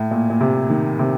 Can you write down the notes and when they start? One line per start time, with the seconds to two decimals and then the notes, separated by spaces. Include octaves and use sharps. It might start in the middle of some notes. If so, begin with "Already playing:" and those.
Already playing: A2
0.11 A#2
0.30 A#2
0.41 C3
0.70 D#3
0.99 C3